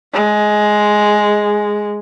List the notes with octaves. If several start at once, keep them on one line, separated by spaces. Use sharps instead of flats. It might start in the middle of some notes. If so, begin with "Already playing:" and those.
G#3